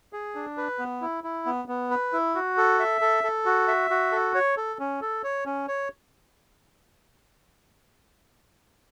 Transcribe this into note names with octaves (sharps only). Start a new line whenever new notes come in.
G#4
D4
B4
B3
E4
E4
B3
B3
B4
E4
F#4
A4
E5
A4
A4
F#4
E5
F#4
A4
C#5
A4
C#4
A4
C#5
C#4
C#5